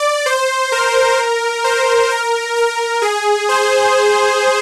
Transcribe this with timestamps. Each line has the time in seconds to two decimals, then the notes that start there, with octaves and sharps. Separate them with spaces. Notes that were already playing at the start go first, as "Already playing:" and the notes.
Already playing: D5
0.26 C5
0.72 A#4
1.64 C5
2.11 A#4
2.56 A#4
3.02 G#4
3.49 C5